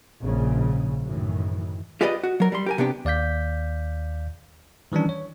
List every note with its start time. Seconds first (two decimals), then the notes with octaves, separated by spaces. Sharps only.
0.23 A#1 G#2 C#3
1.05 F#2 A2 D#3 E3
2.01 F4 G4 G#4 B4 D5 D#5
2.23 F#4
2.40 F#3 A#4
2.52 G3 C6
2.66 G4 A#4 G#5
2.78 C3 B3 D4 G4
3.05 D#2 D5 F5 G6 B6
4.92 D#3 E3 G3 C#4 D4
5.09 C#5